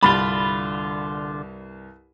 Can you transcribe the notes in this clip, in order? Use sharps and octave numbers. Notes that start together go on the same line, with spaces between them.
C2 G2 D3 F4 B5 A6